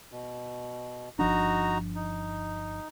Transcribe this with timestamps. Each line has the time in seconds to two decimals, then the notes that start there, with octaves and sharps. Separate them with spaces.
0.12 B2
1.19 G1 F3 D4 D#4 F#4 A#5
1.95 D#4